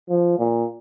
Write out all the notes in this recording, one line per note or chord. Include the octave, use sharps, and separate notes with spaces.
F3
A#2